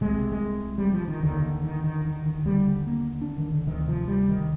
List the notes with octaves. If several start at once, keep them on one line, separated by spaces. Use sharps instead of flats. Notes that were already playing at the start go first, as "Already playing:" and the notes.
C2 C3 G#3
G#3
G3
F3
D#3
D#2 D3 D#3
D#3
D#3
D#3
D#3
D#3
D#2 D3 G3
A#3
D4
D#3
D3
D2 C3 D#3
F3
G3
D#3